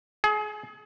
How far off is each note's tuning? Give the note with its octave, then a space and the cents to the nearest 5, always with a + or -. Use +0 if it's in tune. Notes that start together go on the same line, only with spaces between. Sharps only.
G#4 +30